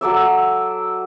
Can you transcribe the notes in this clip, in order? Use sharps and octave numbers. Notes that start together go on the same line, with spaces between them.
F#3 A4 D5 E5